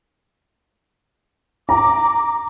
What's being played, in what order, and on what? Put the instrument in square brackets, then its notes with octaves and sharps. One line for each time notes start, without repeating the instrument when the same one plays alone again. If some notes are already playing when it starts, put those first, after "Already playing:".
[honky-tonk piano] A#5 [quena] D6